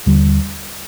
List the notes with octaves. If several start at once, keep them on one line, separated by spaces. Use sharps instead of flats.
D#2 D3 G3